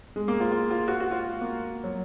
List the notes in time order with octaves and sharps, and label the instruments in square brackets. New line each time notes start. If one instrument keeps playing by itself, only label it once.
[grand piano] G#3
A#3
F4
F4
F4
F#4
F#4
F4
A#3
F#3